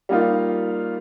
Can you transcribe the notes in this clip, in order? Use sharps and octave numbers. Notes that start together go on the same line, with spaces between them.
G3 A#3 D#4 F4